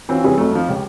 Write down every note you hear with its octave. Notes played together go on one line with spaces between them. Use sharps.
E3 C4 C#4 F4 F#4
C3 E3 G3 C4 C#4 G#4
F2 F#3 A3
F2 F3
C#2 G4 C#5